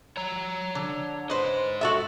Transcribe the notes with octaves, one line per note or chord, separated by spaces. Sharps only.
C#5 A#5
D3
G#2 B4 C5 D#5
F#4 A4 E5